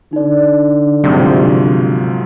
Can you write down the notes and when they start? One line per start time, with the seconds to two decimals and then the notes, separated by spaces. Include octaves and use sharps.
0.13 D3 D#4 D5
1.04 B1 G#2 C3 F3